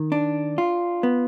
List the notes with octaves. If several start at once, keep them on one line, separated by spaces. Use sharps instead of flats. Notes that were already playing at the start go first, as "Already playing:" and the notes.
Already playing: D#3
D4
F4
B3